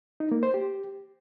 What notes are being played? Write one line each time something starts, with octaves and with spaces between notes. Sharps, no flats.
D#4
A#3
C5
G4